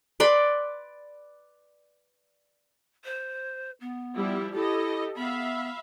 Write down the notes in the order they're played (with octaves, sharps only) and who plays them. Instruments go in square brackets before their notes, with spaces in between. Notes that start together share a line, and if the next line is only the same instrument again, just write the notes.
[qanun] B4 D5 B5 C6
[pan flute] C5
B3
[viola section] F3 G3 E4
[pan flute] E4 [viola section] G4 A4 D#5
[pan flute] B3 [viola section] E5 F5 B5